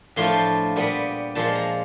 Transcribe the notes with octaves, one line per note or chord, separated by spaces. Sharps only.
A2 F3 A3 D4 F4 C6
A#2 G3 B3 B5
A#2 F3 G#3 A5
A#5